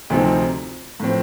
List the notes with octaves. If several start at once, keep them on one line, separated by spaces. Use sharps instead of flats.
D2 C3 F3 C4 D#4
A2 F3 C4